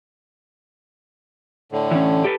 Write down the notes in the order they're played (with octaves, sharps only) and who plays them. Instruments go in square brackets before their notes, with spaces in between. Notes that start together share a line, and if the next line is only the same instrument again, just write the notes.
[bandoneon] A2 D3
[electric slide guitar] E3 C#4
G4 A4 B4